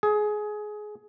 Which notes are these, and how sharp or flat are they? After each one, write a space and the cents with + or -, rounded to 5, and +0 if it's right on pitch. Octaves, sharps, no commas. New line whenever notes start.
G#4 +20